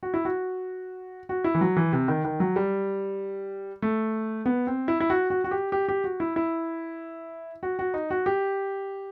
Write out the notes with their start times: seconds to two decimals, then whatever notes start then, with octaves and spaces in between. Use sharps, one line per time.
0.03 F#4
0.14 E4
0.25 F#4
1.29 F#4
1.44 E4
1.55 E3
1.61 F#3
1.77 E3
1.92 C3
2.08 D#3
2.25 D#3
2.40 F#3
2.56 G3
3.82 A3
4.46 B3
4.67 C4
4.88 E4
5.00 E4
5.10 F#4
5.30 F#4
5.44 F#4
5.51 G4
5.72 G4
5.88 G4
6.04 F#4
6.20 E4
6.36 E4
7.63 F#4
7.79 F#4
7.94 D#4
8.10 F#4
8.26 G4